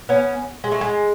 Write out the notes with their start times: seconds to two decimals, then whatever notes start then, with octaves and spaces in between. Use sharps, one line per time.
0.09 B3 C#4
0.64 G#3
0.72 A3
0.81 G#3